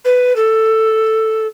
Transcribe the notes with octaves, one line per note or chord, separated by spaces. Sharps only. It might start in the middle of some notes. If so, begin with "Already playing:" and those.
B4
A4